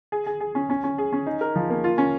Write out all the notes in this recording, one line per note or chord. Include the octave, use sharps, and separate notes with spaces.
G#4
G#4
G#4
C#4
C#4
C#4
G#4
C#4
D#4
A#4
F3
A#3
F4
C#4